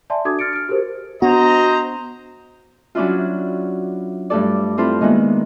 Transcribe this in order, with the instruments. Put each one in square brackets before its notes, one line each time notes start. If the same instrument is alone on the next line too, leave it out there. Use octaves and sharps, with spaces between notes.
[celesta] D5 E5 G#5 A5 C6
D4 F#4 A4 D6 D#6 G#6
F6 A6 C#7 D7
F6 D7
F#4 G4 A4 A#4 C5
[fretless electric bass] B3 D4 [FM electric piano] F#4 [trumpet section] C5 D#5 A#5
[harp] F#3 C#4 D4 E4 F4
G2 A3 A4 D5
C4 E4 F4 A4 C5
D#3 G#3 A#3 B3 E4